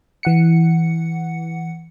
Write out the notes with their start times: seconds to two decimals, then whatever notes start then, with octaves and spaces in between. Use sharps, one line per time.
0.23 E3 F#5 C#7